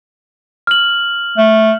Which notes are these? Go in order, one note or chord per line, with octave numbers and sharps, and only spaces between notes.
F6 F#7
A3